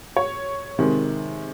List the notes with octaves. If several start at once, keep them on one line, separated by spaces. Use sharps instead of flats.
C#5
C3 D#3 G#3